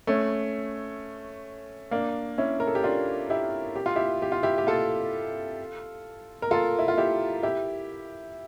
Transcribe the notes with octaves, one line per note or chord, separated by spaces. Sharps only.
A3 C#4
A#3 D4
C#4 E4
A#4
A4
G4
D4 F4
E4 G4
G4
F4
E4 G4
G4
F4
E4 G4
G4
F4 A4
A#4
F4 A4
E4
F4
E4 G4
E4 G4